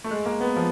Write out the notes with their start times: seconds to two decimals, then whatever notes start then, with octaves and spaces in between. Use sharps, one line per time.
0.04 A3
0.11 G#3
0.26 A#3
0.41 B3
0.56 F3